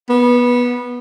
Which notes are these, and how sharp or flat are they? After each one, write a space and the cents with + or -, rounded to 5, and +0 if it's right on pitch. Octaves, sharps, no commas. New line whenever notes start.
B3 -20